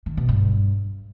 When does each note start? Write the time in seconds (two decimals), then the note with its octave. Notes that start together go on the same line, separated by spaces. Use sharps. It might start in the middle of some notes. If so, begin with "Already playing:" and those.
0.06 D#3
0.17 B2
0.29 G2